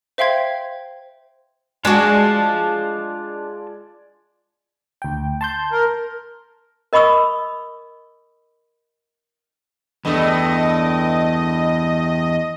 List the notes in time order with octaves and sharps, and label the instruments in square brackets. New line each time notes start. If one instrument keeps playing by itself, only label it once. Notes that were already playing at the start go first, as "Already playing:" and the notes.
[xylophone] C5 E5 F5 G5 C6 G#6
[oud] G#3 F#4 [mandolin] D4 [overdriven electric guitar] F4 A5 [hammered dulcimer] D5 G#5
[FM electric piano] D2 G5
A5 C6 G6
[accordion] A#4
[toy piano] A#4 D#5 B5 C#6 D#6 E6
[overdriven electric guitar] E2 [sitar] G2 A3 [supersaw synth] D#5